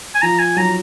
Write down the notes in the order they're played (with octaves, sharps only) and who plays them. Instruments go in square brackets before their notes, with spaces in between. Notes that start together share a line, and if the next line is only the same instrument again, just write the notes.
[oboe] G#5
[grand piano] F3 [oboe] A#5
[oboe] G#5
[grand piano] F#3 [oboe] A#5